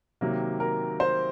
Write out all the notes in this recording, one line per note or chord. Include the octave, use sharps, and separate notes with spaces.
C3 D#3 F#3 A#3
A#4
C5